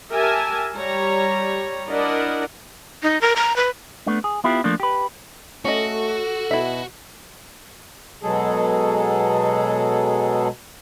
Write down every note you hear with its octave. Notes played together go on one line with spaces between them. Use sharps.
G4 A#4 E5 G#5 A5
G3 C#5 A#5
D4 E4 A#4 D5 D#5 F#5
D#4
A#4
A#5
B4
A3 B3 D4
G#4
B3 E4 F4 G4
F3 A3 A#3 D4
G4 B4
A3 C#4 F#4 A4 D#5
B2 E4 E5
B2 F#3 G#3 G#4 A4